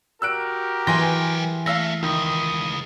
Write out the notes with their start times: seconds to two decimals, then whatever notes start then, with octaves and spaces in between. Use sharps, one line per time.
0.22 F#4 G4 A#4 E6 F#6 D7
0.87 E3 F#3 G#4 G5 G#5 C6 A#6
1.66 A3 F5 E6 A#6
2.03 C#2 D#3 D#6